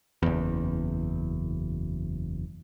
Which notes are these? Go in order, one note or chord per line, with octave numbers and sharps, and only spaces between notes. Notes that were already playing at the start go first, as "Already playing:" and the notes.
F#1 E2